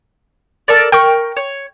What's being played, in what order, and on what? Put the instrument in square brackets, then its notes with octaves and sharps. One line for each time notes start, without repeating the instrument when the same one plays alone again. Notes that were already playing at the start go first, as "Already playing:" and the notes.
[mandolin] A4 A#4 D5
[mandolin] A#4 [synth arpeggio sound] G5 C#6
[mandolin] C#5